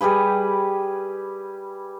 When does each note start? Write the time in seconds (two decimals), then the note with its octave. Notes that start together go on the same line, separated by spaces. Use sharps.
0.01 G3 G4 G#4 B4